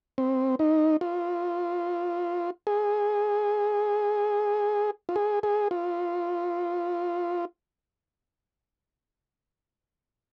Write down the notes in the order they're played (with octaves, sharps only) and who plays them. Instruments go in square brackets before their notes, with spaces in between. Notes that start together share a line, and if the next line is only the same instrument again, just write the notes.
[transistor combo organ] C4
D#4
F4
G#4
F4
G#4
G#4
F4